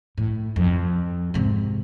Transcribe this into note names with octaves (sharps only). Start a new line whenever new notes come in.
A2
F2
G#2 C3